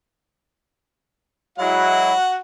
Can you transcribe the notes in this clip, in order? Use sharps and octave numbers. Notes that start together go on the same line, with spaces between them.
F#3 G#3 E4 F#4 F#5